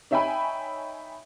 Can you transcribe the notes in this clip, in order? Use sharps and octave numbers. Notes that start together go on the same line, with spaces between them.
D#4 C#5 E5 G5 G#5 B5